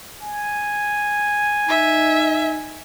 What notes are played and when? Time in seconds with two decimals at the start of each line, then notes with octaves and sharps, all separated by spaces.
0.22 G#5
1.69 D#4 E5